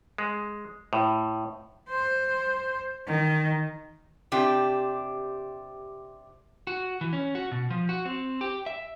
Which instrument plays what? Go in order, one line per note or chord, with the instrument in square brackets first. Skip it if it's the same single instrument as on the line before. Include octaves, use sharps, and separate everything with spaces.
[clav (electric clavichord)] G#3
A2
[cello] C5
D#3
[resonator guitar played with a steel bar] C3 D4 G4
[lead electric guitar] F#4
E3
C#4
F#4
B2
F3
F#4
C4
G4
E5